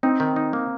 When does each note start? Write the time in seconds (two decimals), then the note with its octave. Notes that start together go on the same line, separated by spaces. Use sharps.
0.03 C4 D#4
0.20 D#3
0.36 D#4
0.53 A#3